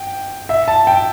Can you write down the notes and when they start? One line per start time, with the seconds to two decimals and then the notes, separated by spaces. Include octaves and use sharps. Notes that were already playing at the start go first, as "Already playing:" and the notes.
Already playing: G5
0.49 E5
0.68 A5
0.87 G5